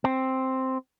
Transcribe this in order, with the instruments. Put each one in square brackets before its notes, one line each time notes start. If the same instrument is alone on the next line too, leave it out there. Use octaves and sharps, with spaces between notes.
[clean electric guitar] C4